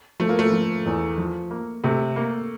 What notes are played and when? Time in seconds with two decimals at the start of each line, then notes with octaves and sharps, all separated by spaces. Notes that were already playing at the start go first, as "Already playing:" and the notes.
0.20 F3 A3
0.29 A#3
0.39 A3
0.52 F3
0.86 E2
1.18 F3
1.51 A#3
1.84 C3 A3
2.16 A#3